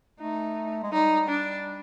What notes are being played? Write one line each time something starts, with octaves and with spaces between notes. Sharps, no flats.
A3 D#4
G#3
G3 D#4
D4